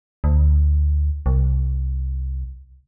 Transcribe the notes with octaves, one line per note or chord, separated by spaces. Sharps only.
D2
C2